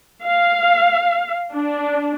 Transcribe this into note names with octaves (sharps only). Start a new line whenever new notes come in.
F5
D4